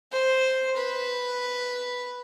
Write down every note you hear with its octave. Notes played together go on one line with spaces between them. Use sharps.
C5
B4